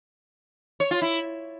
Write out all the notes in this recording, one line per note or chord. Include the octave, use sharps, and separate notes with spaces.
C#5
F4
E4